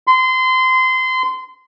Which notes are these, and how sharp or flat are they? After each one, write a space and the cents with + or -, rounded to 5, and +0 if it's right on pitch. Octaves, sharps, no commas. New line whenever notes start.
C6 -25